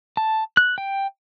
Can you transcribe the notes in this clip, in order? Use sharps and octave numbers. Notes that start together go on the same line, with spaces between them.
A5
F#6
G5